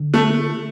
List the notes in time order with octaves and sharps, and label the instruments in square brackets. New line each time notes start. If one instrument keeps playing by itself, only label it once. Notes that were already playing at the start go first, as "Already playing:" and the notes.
Already playing: [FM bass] D3
[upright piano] A3